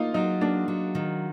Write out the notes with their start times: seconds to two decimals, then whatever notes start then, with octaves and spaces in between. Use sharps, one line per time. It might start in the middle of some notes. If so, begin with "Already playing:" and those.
Already playing: A#3 D#4 F4
0.14 F#3 D#4
0.41 A#3 D4
0.68 F#3
0.95 D#3